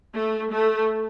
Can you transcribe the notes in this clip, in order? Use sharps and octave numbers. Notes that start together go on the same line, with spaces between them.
A3
A3